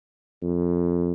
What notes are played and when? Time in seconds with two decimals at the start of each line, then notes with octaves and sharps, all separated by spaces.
0.42 F2